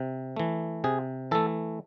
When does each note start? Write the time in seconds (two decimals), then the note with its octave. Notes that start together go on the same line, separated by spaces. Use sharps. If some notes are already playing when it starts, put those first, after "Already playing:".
Already playing: C3
0.36 E3 A3
0.84 C3 G#4
1.31 E3 A3 A4